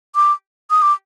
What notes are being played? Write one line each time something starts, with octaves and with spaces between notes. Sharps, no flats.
D6
D#6
D6